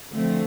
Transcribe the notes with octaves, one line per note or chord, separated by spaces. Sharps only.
D3 F3 A3 C4